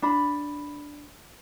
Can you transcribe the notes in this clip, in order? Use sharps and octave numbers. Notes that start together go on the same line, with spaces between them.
D4 B5